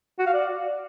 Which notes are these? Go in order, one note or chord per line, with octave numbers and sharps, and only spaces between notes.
F#4
F5
D5